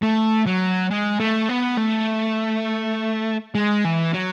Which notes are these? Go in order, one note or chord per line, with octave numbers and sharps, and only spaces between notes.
A3
F#3
G#3
A3
B3
A3
G#3
E3
F#3